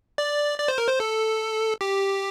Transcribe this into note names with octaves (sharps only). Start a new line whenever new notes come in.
D5
D5
C5
A#4
C5
A4
G4